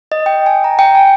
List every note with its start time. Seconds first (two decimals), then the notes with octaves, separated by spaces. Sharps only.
0.12 D#5
0.26 G5
0.46 G#5
0.64 A#5
0.79 G5
0.95 G#5